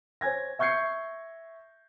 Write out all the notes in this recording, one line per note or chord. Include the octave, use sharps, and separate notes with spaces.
C5 C#5 G#5 G#6 A#6
E5 C#6 G6 G#6 C7 C#7